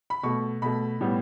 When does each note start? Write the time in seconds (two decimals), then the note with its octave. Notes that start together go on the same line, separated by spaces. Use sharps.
0.10 B5
0.23 B2 A3 C#6
0.62 B2 A3 B5
1.01 A2 G3 B3